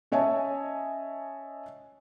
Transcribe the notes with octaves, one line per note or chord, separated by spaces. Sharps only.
C#4 C#5 D#5 E5 G#5 A5